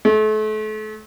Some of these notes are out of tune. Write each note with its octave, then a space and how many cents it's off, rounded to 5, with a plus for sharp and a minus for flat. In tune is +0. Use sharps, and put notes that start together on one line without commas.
A3 -35